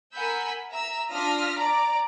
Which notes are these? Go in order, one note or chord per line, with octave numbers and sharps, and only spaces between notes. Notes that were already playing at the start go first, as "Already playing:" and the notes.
A#4 F#5 G#5 B5 E6 G6
E5 A#5 E6
D4 F4 D#6 F6 A#6 B6
D5 A#5 D6